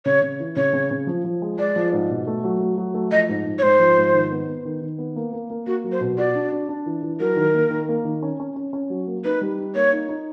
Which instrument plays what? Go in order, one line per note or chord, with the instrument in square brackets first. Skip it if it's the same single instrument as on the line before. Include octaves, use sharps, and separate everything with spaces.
[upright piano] C#3 [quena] C#5
[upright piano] C#3
E3
[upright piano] C#3 [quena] C#5
[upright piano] C#3
C#3
F3
F3
G#3
[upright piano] G#3 [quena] D5
[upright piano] F3
G#2
B2
A3
F#3
A3
F#3
A3
[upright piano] F3 [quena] D#5
[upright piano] G#2
G#2
[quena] C#5
[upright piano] G#2 [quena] C5
[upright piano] F3
G#2
D#3
B3
B3
D#3
D#3
B3
A#3
A#3
A#3
[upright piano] A#3 [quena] F#4
[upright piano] F#3
[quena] C5
[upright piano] B2
[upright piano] F#4 [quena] D5
[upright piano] D4
D4
D4
E3
E3
[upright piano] F#3 [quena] A#4
[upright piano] D#3
A#3
D#3
A#3
D#3
C#4
C#4
C#4
C#4
F#3
A#3
[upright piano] D#4 [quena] B4
[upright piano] G3
D#4
[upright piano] A#3 [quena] C#5
[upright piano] D#4
D#4